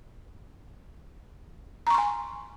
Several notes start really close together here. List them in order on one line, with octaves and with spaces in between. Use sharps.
A#5 C#6 C6 G#5